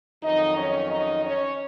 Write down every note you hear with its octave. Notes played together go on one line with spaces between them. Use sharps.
F2 D#3 F#3 D#4 D#5
C#4 C#5
D#4 D#5
C#4 C#5